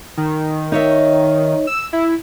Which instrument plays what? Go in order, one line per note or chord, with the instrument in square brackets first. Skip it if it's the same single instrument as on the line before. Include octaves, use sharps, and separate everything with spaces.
[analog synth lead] D#3
[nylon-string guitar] D#4 C#5 E5
[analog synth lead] E6
E4